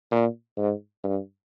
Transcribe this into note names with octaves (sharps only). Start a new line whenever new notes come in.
A#2
G#2
G2